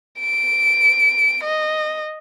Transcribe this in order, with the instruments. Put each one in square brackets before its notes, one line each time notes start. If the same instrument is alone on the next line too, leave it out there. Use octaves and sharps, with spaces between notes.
[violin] D7
D#5